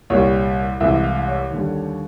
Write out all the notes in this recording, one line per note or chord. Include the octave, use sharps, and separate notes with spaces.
C2 A#2 G3 C#5
C2 C3 E3 G#3 E5
F5
C#5
D#2 D3 G3